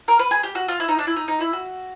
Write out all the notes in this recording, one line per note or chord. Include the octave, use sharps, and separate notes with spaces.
A#4
B4
G#4
G4
F#4
F4
E4
D#4
D4
E4
D#4
D#4
E4
F#4